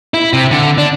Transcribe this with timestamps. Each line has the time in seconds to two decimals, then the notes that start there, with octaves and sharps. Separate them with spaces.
0.14 E4
0.33 C3
0.51 D3
0.78 D4